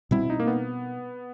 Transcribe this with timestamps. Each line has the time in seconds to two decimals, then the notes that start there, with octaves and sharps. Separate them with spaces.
0.11 B2 G3 C4 E4
0.30 D#4
0.40 A#3
0.47 B3